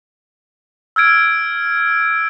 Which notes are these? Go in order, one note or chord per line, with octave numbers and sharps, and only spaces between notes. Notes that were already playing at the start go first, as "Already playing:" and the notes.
E6 F6 G#6 D7